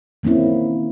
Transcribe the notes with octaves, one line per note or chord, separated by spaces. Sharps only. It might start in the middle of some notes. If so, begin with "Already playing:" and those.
D#3 A#3 C4 C#4 E4